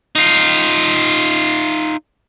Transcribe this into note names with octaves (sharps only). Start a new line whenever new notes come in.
D#4 F4